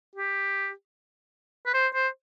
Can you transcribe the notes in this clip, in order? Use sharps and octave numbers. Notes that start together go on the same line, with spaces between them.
G4
B4
C5
C5